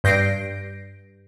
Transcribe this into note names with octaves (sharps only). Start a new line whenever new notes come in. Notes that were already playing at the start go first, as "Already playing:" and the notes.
G2 G6 A#6 C7 D7